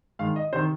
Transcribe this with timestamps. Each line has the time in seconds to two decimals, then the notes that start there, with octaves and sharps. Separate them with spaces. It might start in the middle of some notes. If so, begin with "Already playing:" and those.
0.19 G#2 D#3 F5
0.36 D#5
0.53 C3 D#3 C5